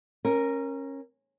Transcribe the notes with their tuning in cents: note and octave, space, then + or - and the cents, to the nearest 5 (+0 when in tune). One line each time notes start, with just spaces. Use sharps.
C#4 -20 A#4 +5